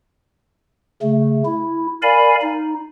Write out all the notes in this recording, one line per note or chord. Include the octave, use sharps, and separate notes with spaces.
C#3 A3
E4
A#4 D5 F5 G#5 B5
D#4